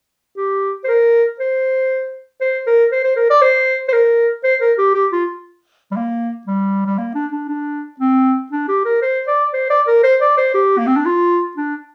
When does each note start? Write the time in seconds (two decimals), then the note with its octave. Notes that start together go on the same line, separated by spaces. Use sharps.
0.37 G4
0.84 C5
0.88 A#4
1.40 C5
2.41 C5
2.67 A#4
2.92 C5
3.04 C5
3.16 A#4
3.30 D5
3.42 C5
3.88 C5
3.93 A#4
4.44 C5
4.61 A#4
4.78 G4
4.94 G4
5.12 F4
5.91 G3
5.96 A#3
6.47 G3
6.86 G3
6.98 A#3
7.15 D4
7.32 D4
7.49 D4
8.00 C4
8.52 D4
8.68 G4
8.85 A#4
9.02 C5
9.27 D5
9.53 C5
9.70 D5
9.87 A#4
10.04 C5
10.21 D5
10.37 C5
10.54 G4
10.78 A#3
10.87 C4
10.96 D4
11.06 F4
11.57 D4